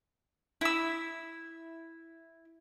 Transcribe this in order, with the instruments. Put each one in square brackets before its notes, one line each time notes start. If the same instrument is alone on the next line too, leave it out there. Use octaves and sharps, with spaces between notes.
[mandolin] E4 E6